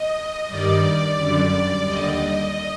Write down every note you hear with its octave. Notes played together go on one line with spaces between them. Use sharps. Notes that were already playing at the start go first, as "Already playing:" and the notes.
Already playing: D#5
G2 D#3 G3 D5
F#2 D3 G3
D#2 D3 G3 D#5